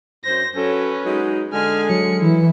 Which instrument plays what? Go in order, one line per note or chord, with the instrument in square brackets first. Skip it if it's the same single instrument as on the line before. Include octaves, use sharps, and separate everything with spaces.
[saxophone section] F#2 C5 [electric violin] A#6
[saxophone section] F#3 A4 [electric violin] C#4 B4
[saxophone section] F#3 G#3 D#4
[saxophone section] D3 G#3 [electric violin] G#5 F6
[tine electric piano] F#3 [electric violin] C#7
[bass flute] E3 [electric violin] E4